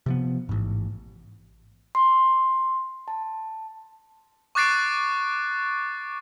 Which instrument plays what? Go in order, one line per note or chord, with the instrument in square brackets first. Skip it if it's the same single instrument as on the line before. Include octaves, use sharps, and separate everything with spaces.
[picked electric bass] C3 F3 B3
A1 G#2
[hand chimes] C6
A5
[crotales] C#6 D6 F#6 A6 C7 D7